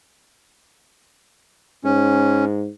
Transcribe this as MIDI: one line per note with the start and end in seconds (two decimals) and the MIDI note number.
1.84 2.68 44
1.84 2.45 61